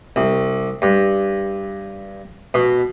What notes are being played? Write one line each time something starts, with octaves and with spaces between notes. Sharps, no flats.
C2
G2
B2